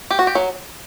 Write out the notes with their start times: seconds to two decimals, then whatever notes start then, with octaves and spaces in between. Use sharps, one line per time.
0.11 G4
0.19 F#4
0.27 G4
0.35 F#3